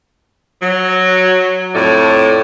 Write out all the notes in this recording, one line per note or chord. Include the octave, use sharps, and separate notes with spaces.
F#3
F2 A2 C#5 D5